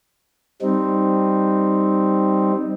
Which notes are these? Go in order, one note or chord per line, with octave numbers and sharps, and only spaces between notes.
G3 C4 D#4